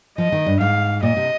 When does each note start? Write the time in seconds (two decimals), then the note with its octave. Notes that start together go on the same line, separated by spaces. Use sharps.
0.18 F3 D#5
0.32 D#3
0.46 G2
0.60 G#2 F5
1.03 A#2 D#5
1.17 C3